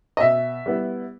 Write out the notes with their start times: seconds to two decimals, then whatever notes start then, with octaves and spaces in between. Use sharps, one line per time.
0.17 D#5
0.20 B2 E5
0.66 G3 B3 E4